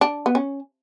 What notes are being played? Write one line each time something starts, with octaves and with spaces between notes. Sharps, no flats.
D4
B3
C#4